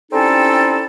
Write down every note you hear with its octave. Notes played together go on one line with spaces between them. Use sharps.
G3 C4 C#4 D#4 E4 A4